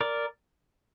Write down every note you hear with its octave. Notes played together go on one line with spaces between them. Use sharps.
A#4 D5